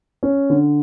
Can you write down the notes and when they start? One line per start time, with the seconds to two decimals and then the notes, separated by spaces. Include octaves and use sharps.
0.23 C#4
0.50 D3